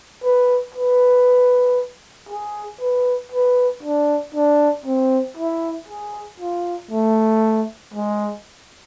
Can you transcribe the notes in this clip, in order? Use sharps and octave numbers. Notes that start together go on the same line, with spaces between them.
B4
B4
G#4
B4
B4
D4
D4
C4
E4
G#4
F4
A3
G#3